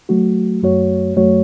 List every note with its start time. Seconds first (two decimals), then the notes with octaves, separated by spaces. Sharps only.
0.09 F#3 A3 F#4
0.62 F#2 F#3 A3 F#4 C#5
1.16 F#2 F#3 A3 F#4 C#5